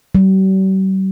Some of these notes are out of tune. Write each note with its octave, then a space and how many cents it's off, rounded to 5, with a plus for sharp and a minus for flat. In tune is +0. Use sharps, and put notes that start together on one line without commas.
G3 -45